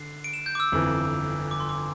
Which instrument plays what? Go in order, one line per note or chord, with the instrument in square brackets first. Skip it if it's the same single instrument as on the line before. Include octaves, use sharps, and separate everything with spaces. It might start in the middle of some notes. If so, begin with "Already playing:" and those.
Already playing: [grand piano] D3 [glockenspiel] C7
[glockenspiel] D7
E7
G6
D6
E6
[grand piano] G1 F2 E3
[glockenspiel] D6
C6
D6